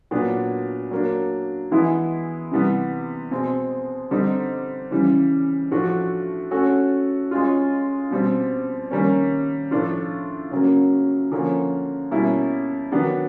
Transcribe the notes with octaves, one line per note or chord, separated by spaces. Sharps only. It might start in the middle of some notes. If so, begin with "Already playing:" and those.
A#2 F#3 B3 D4
F#3 A#3 D4
E3 G#3 B3 E4
C3 E3 G3 B3
B2 G#3 C4
D3 G3 C4 D#4
C#3 E3 G3
A2 F3 A3 D4 F#4
A3 C#4 F#4 A4
G#3 C#4 F4
B2 G3 C4
D#3 G3 A#3 C#4
A2 F3 A3 D4 F4
C#3 F#3 A#3
D3 F3 A#3 C#4
B2 G3 A#3 C#4 E4
D#3 F#3 B3 D4 G4